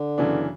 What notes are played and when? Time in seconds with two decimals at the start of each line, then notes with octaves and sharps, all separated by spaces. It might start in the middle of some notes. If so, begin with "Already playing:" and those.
Already playing: D3
0.18 F#2 C#3 E3 B3 D4